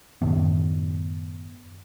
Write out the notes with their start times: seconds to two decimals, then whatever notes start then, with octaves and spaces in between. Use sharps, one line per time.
0.22 F#2 A2 D#3 B3